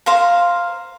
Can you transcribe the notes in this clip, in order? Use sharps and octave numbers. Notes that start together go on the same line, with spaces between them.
C5 F5 A#5